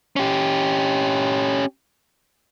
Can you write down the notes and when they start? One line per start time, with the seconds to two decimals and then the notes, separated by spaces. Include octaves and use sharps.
0.16 C#4 G4